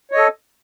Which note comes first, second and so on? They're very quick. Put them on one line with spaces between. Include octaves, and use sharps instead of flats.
C#5 D#5 A4